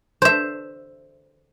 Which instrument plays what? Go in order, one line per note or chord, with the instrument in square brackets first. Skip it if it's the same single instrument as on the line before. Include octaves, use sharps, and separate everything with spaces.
[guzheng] C5 E5